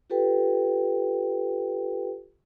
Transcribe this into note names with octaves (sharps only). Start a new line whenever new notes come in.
F4 G4 A4 B4 G5